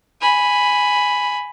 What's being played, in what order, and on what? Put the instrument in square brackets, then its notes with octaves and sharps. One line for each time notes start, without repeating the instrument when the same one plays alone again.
[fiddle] G#5 B5